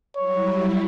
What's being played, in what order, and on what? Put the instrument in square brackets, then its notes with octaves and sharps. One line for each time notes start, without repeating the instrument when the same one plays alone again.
[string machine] F#3 G3 E4 [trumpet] C#5